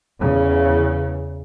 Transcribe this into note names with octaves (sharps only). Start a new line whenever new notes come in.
E2 C#3